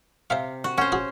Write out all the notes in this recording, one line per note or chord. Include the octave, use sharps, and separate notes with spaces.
C3 C5 E5 F5
F#4
C#4 C5 F#5
F#4 G#4